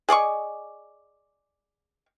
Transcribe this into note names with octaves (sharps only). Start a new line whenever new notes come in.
G#4 D5 D#5 C#6